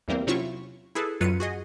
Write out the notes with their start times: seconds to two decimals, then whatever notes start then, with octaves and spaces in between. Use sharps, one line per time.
0.08 E2 E3 G3 A#3 C4
0.27 C3 F#3 C#4 E4 F4 C#6
0.95 E4 G#4 A4 B4
1.21 F#2 F#3 F4 B4 C#7 D#7
1.40 F#4 G#4 D#5